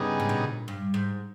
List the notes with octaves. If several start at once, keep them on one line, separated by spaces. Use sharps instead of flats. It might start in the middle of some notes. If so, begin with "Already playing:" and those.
Already playing: G2 C#3 G3 B3 D#4 G#4
G#2
A#2
G2
G#2